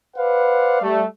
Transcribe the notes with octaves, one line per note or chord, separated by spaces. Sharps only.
B4 C5 D5 F5 F#5
G3 A3